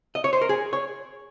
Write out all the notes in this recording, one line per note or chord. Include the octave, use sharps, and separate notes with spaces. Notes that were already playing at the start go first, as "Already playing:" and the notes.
D#5
C#5
C5
A#4
G#4
C#5